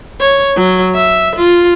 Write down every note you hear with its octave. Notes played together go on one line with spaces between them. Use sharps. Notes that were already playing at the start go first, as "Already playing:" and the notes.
C#5
F#3
E5
F4